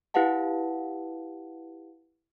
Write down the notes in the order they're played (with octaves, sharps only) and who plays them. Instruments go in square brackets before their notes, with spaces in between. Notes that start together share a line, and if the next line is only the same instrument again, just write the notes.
[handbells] E4 G4 B4 F5 F#5 A5